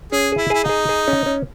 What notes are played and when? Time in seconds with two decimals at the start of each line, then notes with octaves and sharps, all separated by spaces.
0.12 C#4 G#4
0.32 G#4
0.38 E4
0.50 E4 G#4
0.64 D#4
0.69 G#4
0.89 G#4
1.08 C#4
1.26 C#4